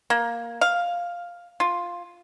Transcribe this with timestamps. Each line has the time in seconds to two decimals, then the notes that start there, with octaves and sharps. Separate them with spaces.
0.10 A#3
0.61 F5
1.60 F4